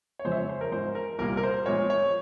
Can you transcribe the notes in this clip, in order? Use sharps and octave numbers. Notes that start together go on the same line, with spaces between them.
C#5
F2 C#3 F3 G#3 C5
E5
C#5
C5
A#4
G#2 F3 G#3 C5
A#4
C2 A#2 G3 A#3 A#4
A#4
C5
A#2 F3 G#3 C#5
C#5